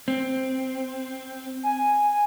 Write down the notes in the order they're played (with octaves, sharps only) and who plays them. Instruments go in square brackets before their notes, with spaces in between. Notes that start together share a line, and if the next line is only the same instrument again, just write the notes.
[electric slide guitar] C4
[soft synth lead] G#5